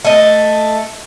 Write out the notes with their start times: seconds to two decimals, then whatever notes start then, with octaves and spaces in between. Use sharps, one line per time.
0.05 A3 D#5